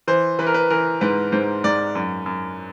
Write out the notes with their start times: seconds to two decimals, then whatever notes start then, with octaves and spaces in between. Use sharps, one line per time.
0.07 E3 C5
0.39 E3 B4
0.47 A#4
0.54 B4
0.70 E3 A#4
1.01 G#2 B4
1.32 G#2 C5
1.64 G#2 D5
1.95 F#2
2.26 F#2